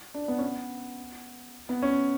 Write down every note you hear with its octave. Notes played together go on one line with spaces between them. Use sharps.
D4
B3
C#4
B3
B3
C#4